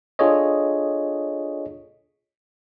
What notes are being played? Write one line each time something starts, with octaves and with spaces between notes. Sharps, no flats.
D4 F4 G#4 A4 C#5 D#5